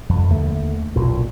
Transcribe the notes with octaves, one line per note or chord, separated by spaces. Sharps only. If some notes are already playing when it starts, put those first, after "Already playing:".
F2
D#2 D3 A3
B1 A#2